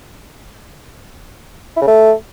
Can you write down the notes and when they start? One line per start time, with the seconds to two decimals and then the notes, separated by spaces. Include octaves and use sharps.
1.77 E4
1.82 C#3
1.87 A3